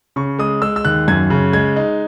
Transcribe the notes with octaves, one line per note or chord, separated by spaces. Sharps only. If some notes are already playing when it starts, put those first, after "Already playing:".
C#3 C#6
G#3 D#6
G#3 E6
E6
D#2 F#6
F#2 G#6
C#3
G#3 G#6
D#4